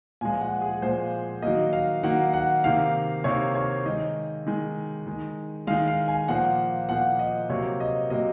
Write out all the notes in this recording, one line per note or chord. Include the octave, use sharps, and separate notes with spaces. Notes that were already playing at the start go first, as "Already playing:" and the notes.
A#2 F3 G#3 G#5
F#5
G#4
A#2 F3 G#3 C5
D#3 F#3 A#3 D#5
F5
D#3 F#3 A#3 F#5
F#5
C3 D#3 A#3 F5
C3 D#3 A#3 C#5
C#5
D#3 G#3 D#5
D#3 G#3
D#3 G#3
D#3 G#3 F5
F5
G#5
A#2 F3 A#3 F#5
A#2 F3 A#3 F#5
D#5
C3 F#3 A#3 C#5
D#5
C3 F#3 A#3 D#5